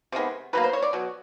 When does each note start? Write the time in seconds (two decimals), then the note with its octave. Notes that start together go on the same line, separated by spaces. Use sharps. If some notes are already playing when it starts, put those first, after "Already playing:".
0.12 C3 D#3 G#3 B3
0.53 B2 F#3 A#3 B4
0.64 C5
0.73 C#5
0.82 D5
0.93 B2 F#3